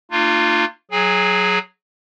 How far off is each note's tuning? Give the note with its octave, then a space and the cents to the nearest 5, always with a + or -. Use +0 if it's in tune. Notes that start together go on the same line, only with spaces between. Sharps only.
A#3 -35 D4 +45 F4 +0
F#3 +0 G#4 +15 G#5 -30